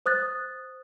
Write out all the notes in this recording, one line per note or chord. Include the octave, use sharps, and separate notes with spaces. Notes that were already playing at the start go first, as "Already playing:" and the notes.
C5 D#6 F#6 A6